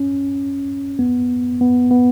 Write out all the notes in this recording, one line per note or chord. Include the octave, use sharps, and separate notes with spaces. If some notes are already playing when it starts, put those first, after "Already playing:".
Already playing: C#4
B3
B3
B3